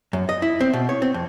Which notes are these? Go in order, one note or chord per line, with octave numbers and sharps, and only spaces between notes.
F#2
D#5
E4
C4
B2
C#5
C4
F2